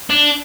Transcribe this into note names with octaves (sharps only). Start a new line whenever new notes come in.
D4